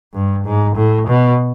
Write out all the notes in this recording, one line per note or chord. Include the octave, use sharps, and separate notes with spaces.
G2
G#2
A2
B2